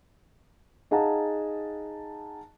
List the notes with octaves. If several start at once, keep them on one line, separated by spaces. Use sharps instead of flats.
D#4 G#4 F5 F#5 A5 A#5